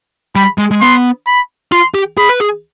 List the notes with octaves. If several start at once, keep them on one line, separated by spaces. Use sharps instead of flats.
G3 B5
G#3
G#3
B3 C6
B5
F4 C6
G4
G#4 B5
B4
G#4